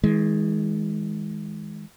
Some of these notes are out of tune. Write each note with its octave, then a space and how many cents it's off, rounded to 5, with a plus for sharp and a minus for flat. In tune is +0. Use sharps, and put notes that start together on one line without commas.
E3 -45 G#3 +0